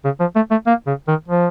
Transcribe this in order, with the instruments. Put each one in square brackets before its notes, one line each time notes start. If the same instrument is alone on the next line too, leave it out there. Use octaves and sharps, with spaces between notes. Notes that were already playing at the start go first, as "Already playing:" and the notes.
[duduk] C#3
F3
A3
A3
A#3
C#3
D#3
F3